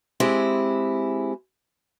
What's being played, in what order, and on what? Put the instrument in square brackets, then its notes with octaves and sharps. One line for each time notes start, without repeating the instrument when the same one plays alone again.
[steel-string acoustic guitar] G#3 C4 E4 G4 G#4